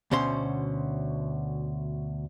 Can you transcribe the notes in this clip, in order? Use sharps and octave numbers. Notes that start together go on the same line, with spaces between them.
D2 B2 C#4 C5 C6